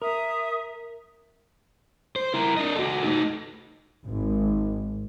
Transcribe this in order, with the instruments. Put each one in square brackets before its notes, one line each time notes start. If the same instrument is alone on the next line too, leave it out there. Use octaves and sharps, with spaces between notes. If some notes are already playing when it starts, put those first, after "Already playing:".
[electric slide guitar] A#4 [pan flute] E5 [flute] D#6
[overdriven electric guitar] C5
E4 A#4
D4 D#5
F#4 A4
A3 D#4
[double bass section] G#1 G#2